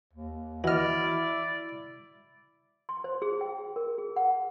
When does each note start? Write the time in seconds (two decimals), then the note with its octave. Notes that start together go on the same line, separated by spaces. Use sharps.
0.13 D#2
0.64 E3 E4 F#4 D5 D#5 F6
2.89 C6
3.04 C5
3.22 G#4
3.41 G5
3.76 A#4
3.98 G#4
4.16 F#5